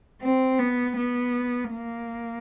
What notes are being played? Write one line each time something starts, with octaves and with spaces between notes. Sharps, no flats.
C4
B3
B3
A#3